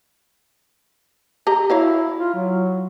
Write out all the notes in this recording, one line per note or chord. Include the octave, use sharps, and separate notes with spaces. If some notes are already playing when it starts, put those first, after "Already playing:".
G4 D#5 A#5
E4 F#4 C#5 F5
F4
F#3